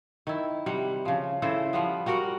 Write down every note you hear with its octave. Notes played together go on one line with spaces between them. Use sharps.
D#3 E4
C3 G3 F#5
C#3 F3
C#3 E3 A4 C5
F3 G3 B3
G3 F#4 A#4 F#5